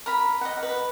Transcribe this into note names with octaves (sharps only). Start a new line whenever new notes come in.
A#4 B5
D#5 F#5
B4